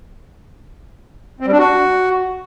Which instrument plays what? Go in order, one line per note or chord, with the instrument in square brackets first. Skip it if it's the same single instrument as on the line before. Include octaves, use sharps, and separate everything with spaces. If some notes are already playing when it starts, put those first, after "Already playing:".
[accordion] C4
G3
D4
F#4